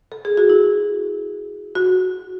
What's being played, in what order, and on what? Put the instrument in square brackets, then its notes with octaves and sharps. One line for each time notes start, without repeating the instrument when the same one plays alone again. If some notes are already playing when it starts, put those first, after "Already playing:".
[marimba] A4
G#4
F#4
E4
F#4